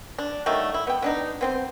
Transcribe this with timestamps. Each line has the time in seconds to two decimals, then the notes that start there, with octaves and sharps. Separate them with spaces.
0.18 D4
0.46 D#3 F#3 G3 A3
0.74 E4
0.87 B3 G5
1.02 B3 D4 D#4
1.41 B3 C4 C5